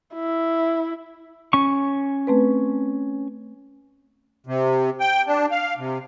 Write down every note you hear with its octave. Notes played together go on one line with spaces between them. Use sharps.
E4
C#4 C#6
A3 C4 B4
C3
G5
D4
F5
C3